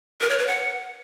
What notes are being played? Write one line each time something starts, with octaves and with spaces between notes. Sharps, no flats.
A#4
C#5
B4
F#5